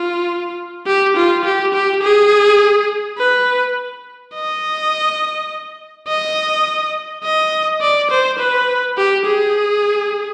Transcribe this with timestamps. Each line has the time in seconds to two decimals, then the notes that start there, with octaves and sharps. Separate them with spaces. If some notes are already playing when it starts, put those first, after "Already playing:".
Already playing: F4
0.86 G4
1.17 F4
1.45 G4
1.74 G4
2.03 G#4
3.18 B4
4.34 D#5
6.08 D#5
7.24 D#5
7.81 D5
8.11 C5
8.39 B4
8.97 G4
9.26 G#4